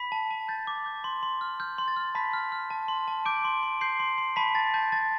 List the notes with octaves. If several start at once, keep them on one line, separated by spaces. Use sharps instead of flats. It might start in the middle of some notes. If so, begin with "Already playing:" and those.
Already playing: B5 B6
A5
A5
G6 A6
D6
G6
C6
C6
F6
F6 G6
C6
A6
F6
A5 B5 B6
F6
F6
A5
C6
A5
D6 G6 D7
C6
C6
C6 G6 C7
C6
C6
A5 B5 B6
A5 A6
A5 G6
A5 A6